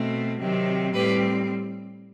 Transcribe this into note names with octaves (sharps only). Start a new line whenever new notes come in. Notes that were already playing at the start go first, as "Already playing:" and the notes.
Already playing: B2 A3 C4
C3 D#3 F#3 C4
A2 G3 C4 G4 B4